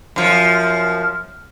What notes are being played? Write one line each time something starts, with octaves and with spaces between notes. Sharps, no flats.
F#2 F3